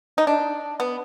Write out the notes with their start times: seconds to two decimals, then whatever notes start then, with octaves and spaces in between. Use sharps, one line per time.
0.18 D#4
0.27 D4
0.80 B3